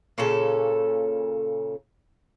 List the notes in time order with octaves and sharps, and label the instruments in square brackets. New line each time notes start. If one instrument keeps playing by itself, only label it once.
[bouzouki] A#2 C#3 C#4 A4